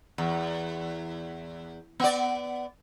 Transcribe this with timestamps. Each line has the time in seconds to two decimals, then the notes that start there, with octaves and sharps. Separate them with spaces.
0.18 E2
2.00 B3 D5